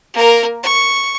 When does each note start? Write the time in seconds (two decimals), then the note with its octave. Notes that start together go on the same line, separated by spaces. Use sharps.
0.14 A#3 A#4
0.63 C#6